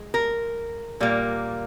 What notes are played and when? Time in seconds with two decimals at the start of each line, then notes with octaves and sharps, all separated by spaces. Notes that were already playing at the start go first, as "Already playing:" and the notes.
Already playing: G#3
0.14 A#4
1.00 A#2 G3 A#3